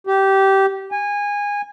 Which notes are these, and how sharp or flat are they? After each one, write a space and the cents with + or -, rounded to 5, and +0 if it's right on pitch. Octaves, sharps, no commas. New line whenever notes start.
G4 -15
G#5 -20